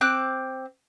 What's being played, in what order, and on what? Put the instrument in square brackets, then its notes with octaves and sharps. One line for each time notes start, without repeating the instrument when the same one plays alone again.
[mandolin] C4 D6 F#6